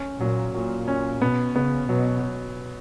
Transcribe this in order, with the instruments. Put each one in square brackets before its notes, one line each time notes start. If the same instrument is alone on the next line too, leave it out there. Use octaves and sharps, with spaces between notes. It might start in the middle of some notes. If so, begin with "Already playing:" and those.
Already playing: [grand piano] C#4
[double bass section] A#2 [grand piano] F#3
[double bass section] A#2 [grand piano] F#3
[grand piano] C#4
[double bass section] B2 [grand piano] B3
[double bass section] C#3 [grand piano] B3
[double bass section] B2 [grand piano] F#3